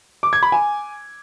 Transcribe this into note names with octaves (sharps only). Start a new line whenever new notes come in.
D6
G#6
B5
G#5